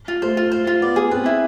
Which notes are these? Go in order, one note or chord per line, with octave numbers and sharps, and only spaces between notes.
F4
A3 C5
F4
C5
F4
B3 D5
G#4
C4 B4
E4